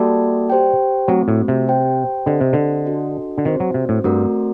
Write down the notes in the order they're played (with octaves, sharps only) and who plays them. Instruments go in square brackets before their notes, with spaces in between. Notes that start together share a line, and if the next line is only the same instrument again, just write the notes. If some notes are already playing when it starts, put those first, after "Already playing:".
Already playing: [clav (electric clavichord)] G3 [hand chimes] A#3 F#4 A4 D5 A5
[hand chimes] G4 C5 G5
[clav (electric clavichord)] F#3 [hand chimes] A3 C4 F#4
[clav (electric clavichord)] A2
C3
[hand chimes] G4 C5 G5
[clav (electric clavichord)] D3 [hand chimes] C4 G4 C5 D#5
[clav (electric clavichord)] C3
D3
[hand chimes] D4 F#4 A4 D#5
[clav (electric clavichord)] D3
[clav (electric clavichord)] D#3 [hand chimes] C4 F#4 C5
[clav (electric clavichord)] F#3
C3
A2
[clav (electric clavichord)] G2 [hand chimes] A3 C4 F#4 A#4 D5